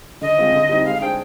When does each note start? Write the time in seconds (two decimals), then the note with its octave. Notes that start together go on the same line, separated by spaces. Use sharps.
0.22 D3 D#5
0.37 G#3 C4 F4 C5
0.53 D3
0.69 G3 C4 D#4
0.85 G#3 F5
0.95 F5
1.01 D4 G#4 C5 G5